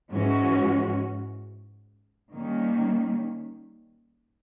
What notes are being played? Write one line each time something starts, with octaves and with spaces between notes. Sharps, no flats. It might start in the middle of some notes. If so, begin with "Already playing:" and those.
G#2 E3 G#3 C#4 F#4
D#3 G3 A#3 C#4